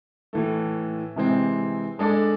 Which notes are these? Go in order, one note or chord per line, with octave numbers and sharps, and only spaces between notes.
A2 E3 A3
C3 E3 G#3 C4
G#3 D4 A4 D5